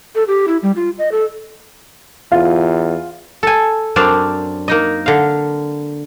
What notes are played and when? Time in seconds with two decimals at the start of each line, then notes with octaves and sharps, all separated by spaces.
0.15 A4
0.28 G4
0.48 E4
0.63 G3
0.76 F4
0.99 D#5
1.12 A4
2.32 E2 F4
3.43 A4 G#5
3.96 F#2 C4 D4 D5 F5
4.68 A#3 D#4 D#5
5.06 D3 F5